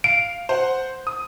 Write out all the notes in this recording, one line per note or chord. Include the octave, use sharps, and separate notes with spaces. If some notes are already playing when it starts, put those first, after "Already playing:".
F5 D7
C5 F#5
D#6